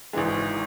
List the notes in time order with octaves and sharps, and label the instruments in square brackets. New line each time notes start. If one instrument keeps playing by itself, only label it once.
[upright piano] G#1 G#2 E3 G#3